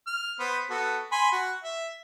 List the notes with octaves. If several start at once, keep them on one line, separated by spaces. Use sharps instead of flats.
F6
B3 B4 C5
B3 F#4 A4
G#5 B5 C6
F#4
E5